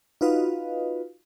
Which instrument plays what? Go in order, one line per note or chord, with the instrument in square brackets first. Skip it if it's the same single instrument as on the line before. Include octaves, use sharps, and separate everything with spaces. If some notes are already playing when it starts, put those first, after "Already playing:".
[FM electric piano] D#4 F4 F#4 B4 D#5 F5